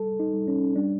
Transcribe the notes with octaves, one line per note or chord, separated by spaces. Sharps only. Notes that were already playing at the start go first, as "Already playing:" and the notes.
Already playing: G3 A4
D#4
G3
C#4
G3 D4